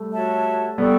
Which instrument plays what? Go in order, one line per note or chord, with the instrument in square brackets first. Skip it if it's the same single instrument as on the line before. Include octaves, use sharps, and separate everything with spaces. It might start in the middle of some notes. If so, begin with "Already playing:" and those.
Already playing: [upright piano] G3 A3
[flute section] F#4 C#5 E5 A5
[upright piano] G3 B3 [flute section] A4 D5 G5 C#6